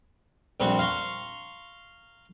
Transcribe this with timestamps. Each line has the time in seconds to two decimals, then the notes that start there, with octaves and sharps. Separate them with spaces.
0.60 A#1 G3 C4 F#4 G#5 C#6
0.79 F5 A#5 C6 C#6